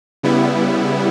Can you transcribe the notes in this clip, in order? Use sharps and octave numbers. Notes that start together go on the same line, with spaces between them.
C#3 G3 B3 E4